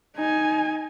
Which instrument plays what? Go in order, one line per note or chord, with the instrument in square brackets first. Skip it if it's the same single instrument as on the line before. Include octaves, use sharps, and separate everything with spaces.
[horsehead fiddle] D#4 G#5